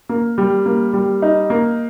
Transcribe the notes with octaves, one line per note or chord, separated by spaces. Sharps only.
A#3
G3
A#3
G3
D#4
A#3